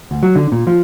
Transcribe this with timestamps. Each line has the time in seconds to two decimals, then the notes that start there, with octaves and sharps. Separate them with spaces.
0.11 D2
0.23 F#3
0.35 D3
0.52 A#2
0.67 F3